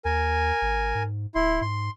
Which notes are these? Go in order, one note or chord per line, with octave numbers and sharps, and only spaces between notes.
D#2 A#4 G#5
G#1
G#2
D1 E4 C6
G#2 C6